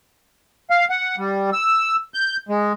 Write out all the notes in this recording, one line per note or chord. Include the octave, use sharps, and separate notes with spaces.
F5
F#5
G3
E6
G6
G#3